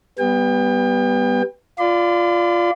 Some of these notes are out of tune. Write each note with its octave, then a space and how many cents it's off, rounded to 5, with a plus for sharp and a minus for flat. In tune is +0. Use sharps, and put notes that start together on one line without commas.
G3 +0 B3 +0 G5 +35
F4 -5 D5 +0 C6 -45